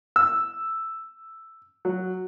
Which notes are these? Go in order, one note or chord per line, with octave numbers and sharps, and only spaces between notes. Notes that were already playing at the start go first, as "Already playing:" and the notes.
E6
F#3